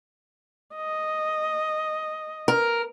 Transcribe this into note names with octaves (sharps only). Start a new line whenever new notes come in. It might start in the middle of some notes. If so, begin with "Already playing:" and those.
D#5
A#4